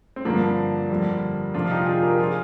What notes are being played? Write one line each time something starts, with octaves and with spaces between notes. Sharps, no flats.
C4
G2 D3 F3 A#3 D4
F2 D3 G3
F2 C3 F3 D4 F4
F4
D#4 G4
F4 G#4
G4 A#4
F3 F4 G#4